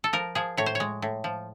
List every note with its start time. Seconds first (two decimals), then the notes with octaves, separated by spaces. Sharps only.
0.04 A4
0.13 F3 A#4
0.35 F3 G#4
0.57 A2 C#5
0.66 C5
0.75 C#5
0.80 G#3
1.02 A2
1.24 F3